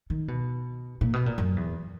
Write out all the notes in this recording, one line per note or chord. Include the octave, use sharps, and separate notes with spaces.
D#3
B2
A#2
B2
A#2
F#2
E2